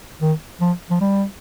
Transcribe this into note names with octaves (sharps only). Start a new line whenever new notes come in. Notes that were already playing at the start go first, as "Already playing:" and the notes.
D#3
F3
F3
G3